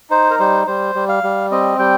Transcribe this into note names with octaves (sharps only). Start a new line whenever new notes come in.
D#4 C5
A#4
G3 C5
G3 C5
G3
F5
G3
C4 D#5
G3 G5